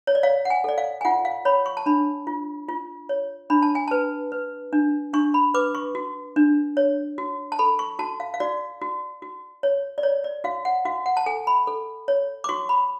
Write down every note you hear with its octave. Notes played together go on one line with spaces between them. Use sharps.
C#5
D5
C#5 F5
F#5
G#5
A4 D5
F5
G#5
F4 F#5
F5
C#5 B5
C#6
A5
D4 B5
F4
F4
C#5
D4 B5
A5
G#5
B4 A5
B4
D4
D4 C#6
B5
B4 D6
C#6
F#4
D4
C#5
F#4
A5
A4 B5
C#6
F#4 A5
F5
F5
F#4 D5
F#4
F#4
C#5
D5
C#5
D5
F#4 F5
F#5
F#4 F5
F#5
A5
A4 G#5
B5
A4
C#5
D6
F#4 C#6
B5